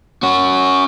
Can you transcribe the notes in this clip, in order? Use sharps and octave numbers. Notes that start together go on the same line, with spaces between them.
C#4 F#4